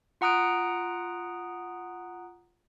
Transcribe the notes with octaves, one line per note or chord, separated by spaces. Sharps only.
F4 F#5 A#5 D#6 F#6 D7